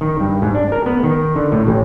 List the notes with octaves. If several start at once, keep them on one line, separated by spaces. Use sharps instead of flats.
D#3
G2
G#2
D4
A#4
B3
D#3
D3
A2
A1